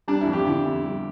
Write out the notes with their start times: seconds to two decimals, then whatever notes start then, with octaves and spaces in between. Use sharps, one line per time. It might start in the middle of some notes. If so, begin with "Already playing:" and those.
0.08 G3 D4
0.21 E4
0.27 F2
0.33 G4
0.46 D3 E4
0.66 F2
0.84 G3